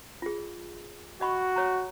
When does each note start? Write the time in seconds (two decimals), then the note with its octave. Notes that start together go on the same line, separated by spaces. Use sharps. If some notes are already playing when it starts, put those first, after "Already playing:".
0.22 F4 G#4
1.21 F#4 D#5 B5 C#6
1.56 C#5 A#5